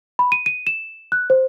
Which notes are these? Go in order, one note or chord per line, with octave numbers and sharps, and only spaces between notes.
B5
D#7
D#7
E7
F#6
C5